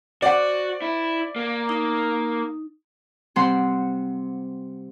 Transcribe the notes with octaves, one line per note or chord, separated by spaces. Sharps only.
F#4 C5 D5 F#5
E4
A#3
D#4
C3 G3 C4 F#5 C6